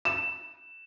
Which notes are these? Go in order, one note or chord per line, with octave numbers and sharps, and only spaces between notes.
E7